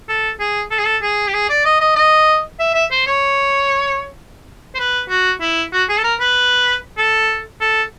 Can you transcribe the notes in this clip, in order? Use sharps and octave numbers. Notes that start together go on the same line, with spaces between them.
A4
G#4
A4
G#4
A4
G#4
G4
G#4
D5
D#5
D#5
D#5
E5
E5
C5
C#5
C5
B4
F#4
E4
F#4
G#4
A4
A#4
B4
A4
A4